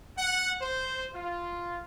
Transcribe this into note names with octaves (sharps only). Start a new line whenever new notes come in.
F#5
C5
F4